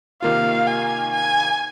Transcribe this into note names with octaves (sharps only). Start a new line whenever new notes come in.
C3 D#3 A#3 F4 F5
G#5
G#5